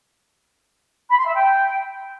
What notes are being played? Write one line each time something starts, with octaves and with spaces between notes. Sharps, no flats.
B5
C6
E5
G5